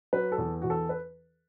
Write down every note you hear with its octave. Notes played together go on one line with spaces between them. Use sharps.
F#3 B4
A4
E2
E2 F#4
A4
B4